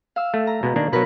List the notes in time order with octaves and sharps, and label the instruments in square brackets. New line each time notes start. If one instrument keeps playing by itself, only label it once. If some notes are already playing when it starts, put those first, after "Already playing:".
[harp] F5 E6
[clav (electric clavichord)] A3
[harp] A#5
[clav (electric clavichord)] B2 G#3 B3
D#3 A#3 D4
[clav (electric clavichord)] B2 F#3 [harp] A#4 B4 B5